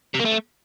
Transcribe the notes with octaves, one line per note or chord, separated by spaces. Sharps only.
C3
A#3
A3